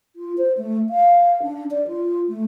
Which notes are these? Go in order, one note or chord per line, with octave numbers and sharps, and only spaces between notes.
F4
C5
A3
F5
D4
D5
F4
A3